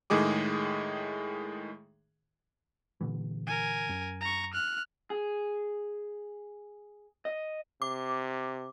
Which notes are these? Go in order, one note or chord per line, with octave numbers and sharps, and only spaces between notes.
A2 D#3 G#3 G#4 D6
A#2 D3 E3
A#4 G#5
F#2
A#5 C#6
F6 F#6
G#4
D#5
C3 D6